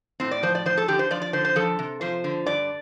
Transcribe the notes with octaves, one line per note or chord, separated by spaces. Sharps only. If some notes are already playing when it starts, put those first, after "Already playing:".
A2 C4
D5
F3 C5
D5
F3 C5
A4
D3 G4
C5
F3 D5
D5
D3 C5
C5
F3 A4
C3
F3 C5
D3
G2 D5